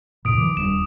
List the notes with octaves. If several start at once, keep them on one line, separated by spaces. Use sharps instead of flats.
D2 A#2 D#6 D7
D#3 F3 D6
D#1 G3 D4 E7